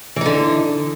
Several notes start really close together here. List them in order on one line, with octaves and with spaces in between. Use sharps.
E3 D#4 D3